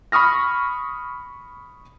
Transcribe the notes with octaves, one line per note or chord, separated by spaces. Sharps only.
B5 C#6 D#6 F6 A#6